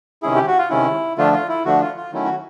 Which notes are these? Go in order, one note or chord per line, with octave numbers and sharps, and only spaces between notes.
C3 D#3 G#3 C#4 E4 G#4
G4
F#4
F4
C3 D#3 G#3 C#4 E4
D3 F3 A3 D4 F4
F4
E4
D3 F3 A3 D4 F#4
F4
F4
D#3 F#3 A3 C#4 E4
F#4